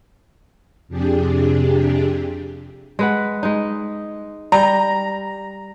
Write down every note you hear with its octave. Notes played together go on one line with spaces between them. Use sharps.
F2 C3 D4 G4 G#4
G#3 B4 F#5
G#3 D#4
G3 A#5